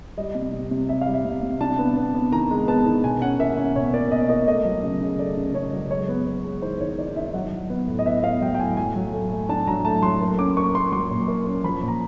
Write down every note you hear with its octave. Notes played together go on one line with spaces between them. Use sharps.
G3 D#5
C3
C3
C3
G3 E5
F5
G3
E5
C3
C3
D4 A5
B3
B3
B3
D#3 A#5
G#3
B3 A5
D#3
B2 G#5
C#4 F#5
A#3 E5
C#4
B2 C#5
A#3 D5
B2 D#5
A#3 D#5
A3 D#5
F#3
C#3
C#3
A3 D5
C#3
C#3 C#5
F#3
G#3 C#5
B3
B3
G#3
D#3 C5
D#3 C#5
D#4 D5
D#4 E5
F#3 F#5
F#3
B3
A2
D#5
B3 E5
B3 F5
F#3 G5
G5
A2 G#5
F#3 G#5
F#3
A3
A3
D4 A5
F#3 A#5
A3 A5
F#3 C6
A#3
C#4 D6
A#3 C#6
A#3 C6
F#3 C6
A#2
A#3
C#4
F3 B5
A#2
A#5